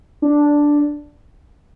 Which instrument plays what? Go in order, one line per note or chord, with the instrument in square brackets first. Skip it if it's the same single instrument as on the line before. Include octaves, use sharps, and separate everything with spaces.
[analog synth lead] D4